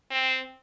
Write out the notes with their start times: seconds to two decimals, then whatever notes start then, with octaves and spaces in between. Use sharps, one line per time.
0.11 C4